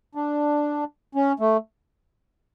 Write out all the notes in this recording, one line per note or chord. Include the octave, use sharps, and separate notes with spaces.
D4
C#4
A3